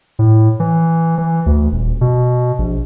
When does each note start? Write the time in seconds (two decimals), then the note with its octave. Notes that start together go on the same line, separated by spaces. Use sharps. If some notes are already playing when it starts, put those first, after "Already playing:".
0.19 A2
0.60 E3
1.18 E3
1.46 D2
1.73 D#1
2.01 B2
2.59 A#1